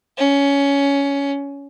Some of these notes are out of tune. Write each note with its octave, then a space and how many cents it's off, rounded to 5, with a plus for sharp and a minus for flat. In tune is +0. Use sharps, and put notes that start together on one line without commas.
C#4 +15